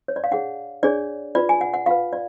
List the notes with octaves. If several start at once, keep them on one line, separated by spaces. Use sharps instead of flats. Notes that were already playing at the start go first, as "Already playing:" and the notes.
C#5
D5
F5
D4 G#4 C#5 F#5
D4 G#4 C#5 D5
F4 B4 D5
G#5
F#5
F#5
F4 B4 F5
D5